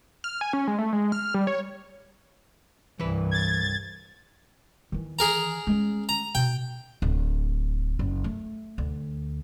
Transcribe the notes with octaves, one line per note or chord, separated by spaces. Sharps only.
F6
G#5
C#4
G#3
A3
G#3
F6
G3
C#5
C2 G2 E3 B4
G#6 A6
D#3 E3
G#4 A#4 A#5
G#3 C#4
A#5
B2 G5
D1
F#1
A3
D2